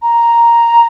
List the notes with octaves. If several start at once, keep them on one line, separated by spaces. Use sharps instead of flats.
A#5